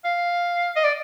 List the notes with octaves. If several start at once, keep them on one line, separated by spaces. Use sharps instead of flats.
F5
D#5
D5